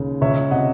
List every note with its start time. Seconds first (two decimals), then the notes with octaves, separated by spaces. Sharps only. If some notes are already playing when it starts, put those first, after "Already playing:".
Already playing: D#2 C#3
0.21 C#2 C#5 E5
0.51 C3 D#5 F#5